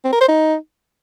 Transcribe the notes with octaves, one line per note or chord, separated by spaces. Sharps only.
C4
A#4
C5
D#4